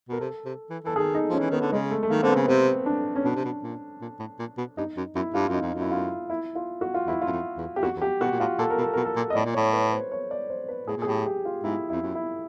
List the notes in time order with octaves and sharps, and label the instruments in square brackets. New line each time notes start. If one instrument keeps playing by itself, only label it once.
[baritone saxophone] B2 [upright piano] A#4
[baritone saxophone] C3 [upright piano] A4
[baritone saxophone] C3
E3
[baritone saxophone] E3 [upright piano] A4
[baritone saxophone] D#3 [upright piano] G#4
[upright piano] D#4
[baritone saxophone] F3 [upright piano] C#4
[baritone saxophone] E3
[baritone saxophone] D#3 [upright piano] B3
[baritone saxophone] D3
[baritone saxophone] C#3 [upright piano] G#3
[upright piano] A3
A3
[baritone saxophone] D#3 [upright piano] A#3
[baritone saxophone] D3 [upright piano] C4
[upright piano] B3
[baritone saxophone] C#3
[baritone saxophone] C3 [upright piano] C4
[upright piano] D4
C#4
[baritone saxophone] B2 [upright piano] D4
[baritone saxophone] C3
B2
A#2
A#2
A2
A#2
B2
[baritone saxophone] G2 [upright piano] D#4
[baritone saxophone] F#2
[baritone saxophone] F#2 [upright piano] E4
[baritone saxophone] G2 [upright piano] F4
[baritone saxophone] F#2
[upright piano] D#4
[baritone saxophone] F2
F#2
[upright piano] E4
F4
E4
F4
F#4
F4
[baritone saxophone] E2 [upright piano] E4
[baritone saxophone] F#2 [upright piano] F4
[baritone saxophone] F2
E2
[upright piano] G4
[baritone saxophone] F2 [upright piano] F#4
[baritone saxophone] E2
[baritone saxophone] F2 [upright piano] G4
[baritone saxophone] B2 [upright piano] F#4
[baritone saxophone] A#2
[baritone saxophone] A2 [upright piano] F4
[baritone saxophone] A#2 [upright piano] A4
[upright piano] A#4
[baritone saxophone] B2
[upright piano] A4
[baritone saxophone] B2 [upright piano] A#4
[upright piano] A4
[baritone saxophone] A#2
[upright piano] D#5
[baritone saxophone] A2 [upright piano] D5
[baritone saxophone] A#2
[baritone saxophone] A2 [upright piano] C#5
[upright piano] B4
C5
C#5
D5
C5
B4
[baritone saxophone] A2 [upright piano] G#4
[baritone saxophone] A#2
[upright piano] G#4
[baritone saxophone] A2 [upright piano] G4
[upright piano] G4
F4
[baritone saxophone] G#2 [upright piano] E4
[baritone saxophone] F2 [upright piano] E4
[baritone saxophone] F#2
[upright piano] E4